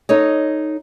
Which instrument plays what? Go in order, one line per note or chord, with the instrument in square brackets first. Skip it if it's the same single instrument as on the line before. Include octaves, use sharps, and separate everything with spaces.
[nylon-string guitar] D#4 A4 C#5 D#5